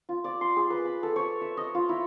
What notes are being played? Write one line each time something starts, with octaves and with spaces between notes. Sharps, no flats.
F4
D5
C6
G#4
B4
B5
A4
C#5
E5
D#5
F4
E4